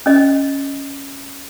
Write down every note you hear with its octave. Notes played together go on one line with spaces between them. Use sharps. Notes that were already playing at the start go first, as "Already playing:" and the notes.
C#4 D#5